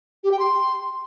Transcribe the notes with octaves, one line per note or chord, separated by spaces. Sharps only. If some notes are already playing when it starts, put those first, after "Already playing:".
G4
G5
C6